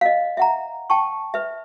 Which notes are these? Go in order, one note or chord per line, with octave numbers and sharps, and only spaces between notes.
D#5 F5
E5 F#5 A#5
G5 A5 C#6
B4 E5